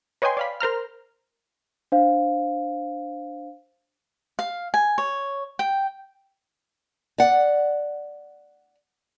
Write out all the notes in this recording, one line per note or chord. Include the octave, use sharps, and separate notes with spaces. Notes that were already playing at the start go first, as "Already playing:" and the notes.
B4 C#5 D#5 G5 G#5 C6
D5 F5 B5
A#4 C5 A#5 F6
D4 C5 F5
F5
G#5
C#5
G5
D5 F#5